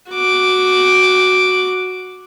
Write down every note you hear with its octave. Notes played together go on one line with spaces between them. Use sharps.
F#4 D6